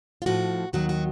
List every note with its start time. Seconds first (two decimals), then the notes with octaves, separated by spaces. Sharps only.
0.22 F4
0.26 A2 F3 F#4
0.73 D#2 D#3 F#3 F#4
0.89 F#4